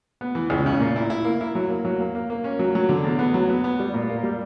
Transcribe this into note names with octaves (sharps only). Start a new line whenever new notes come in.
B3
E3
C#2
C#3
A#2
E4
E4
A#3
E4
F#3
A#3
F#3
A#3
A#3
A#3
C#4
F#3
F#3
D3
E2
B3
F#3
B3
B3
G3
A#2
A#3
G3